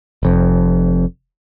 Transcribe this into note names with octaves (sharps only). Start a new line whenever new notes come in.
F1 F2